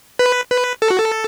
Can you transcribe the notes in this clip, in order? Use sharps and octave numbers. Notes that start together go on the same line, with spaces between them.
B4
B4
A4
F#4
A4